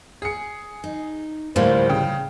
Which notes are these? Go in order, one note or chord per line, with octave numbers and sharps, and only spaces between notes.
G#4 C#7
D#4
D2 A2 F3 G3 A#3 C5
C#3 G5